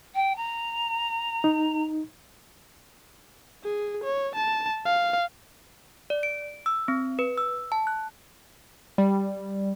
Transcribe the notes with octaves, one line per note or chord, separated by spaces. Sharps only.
G5
A#5
D#4
G#4
C#5
A5
F5
D5
D7
E6
C4
B4
E6
A5
F#6
G3